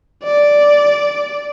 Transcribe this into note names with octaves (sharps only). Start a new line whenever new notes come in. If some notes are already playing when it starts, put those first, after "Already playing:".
D5